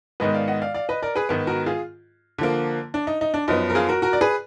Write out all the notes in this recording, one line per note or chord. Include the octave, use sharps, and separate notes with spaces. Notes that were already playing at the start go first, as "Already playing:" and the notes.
G#2 D#3 G#3 B3 B4 D#5
D5 F5
D#5 F#5
D5 F5
D5 F5
B4 D#5
A#4 D5
G#4 B4
G#2 D#3 G#3 B3
F#4 A#4
F4 G#4
D3 F3 A#3
D4
D#4
D#4
D4
F#2 F3 B3 D#4
A#4
F4 G#4
F#4 A#4
F#4 A#4
D5
G#4 B4